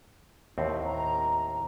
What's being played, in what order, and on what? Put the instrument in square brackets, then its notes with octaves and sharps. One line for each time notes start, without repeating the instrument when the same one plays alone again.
[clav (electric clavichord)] D#2 A2 C4
[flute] A#5